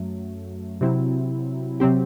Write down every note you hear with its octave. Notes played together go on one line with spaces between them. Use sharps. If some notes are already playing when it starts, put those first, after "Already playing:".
Already playing: F#2 F#3 A3
C3 F#3 C4 E4
C3 F#3 C4 G4